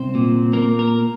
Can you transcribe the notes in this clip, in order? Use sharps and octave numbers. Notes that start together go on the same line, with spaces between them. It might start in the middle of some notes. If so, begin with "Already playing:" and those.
Already playing: C2 C4 C5
A#2
A#3 A#4
A#4